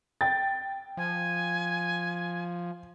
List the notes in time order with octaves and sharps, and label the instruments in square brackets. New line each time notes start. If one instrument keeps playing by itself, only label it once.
[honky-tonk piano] G5 A6
[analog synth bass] F3 [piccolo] G#5